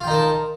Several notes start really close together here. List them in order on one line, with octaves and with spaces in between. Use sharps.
F4 G5 D#4 A#4 A5